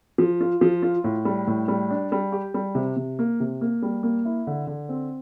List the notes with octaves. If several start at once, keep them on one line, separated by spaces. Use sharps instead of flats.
F3
F4
F3
F4
A2
G3
A2
G3
D4
G3
G4
G3
C3
C3
A#3
C3
A#3
G3
A#3
E4
D3
D3
C4